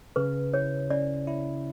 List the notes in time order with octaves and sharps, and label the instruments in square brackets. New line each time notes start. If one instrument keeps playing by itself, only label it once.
[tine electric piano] C#3 [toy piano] B4
[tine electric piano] E4 [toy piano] C#5
[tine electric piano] C#4 [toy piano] D5
[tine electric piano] E4